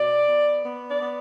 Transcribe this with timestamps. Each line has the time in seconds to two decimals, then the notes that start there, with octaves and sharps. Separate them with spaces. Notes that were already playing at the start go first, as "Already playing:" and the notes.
Already playing: B2 D5
0.27 B3
0.64 B3
0.88 D5
1.00 B3